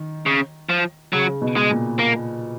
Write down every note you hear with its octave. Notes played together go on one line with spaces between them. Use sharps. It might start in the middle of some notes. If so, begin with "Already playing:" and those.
Already playing: D#3
C#3
F3
C#3 F#3
B2
G#3
A#2
A#3